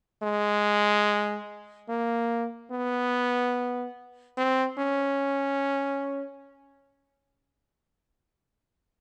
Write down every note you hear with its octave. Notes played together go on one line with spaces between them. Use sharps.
G#3
A#3
B3
C4
C#4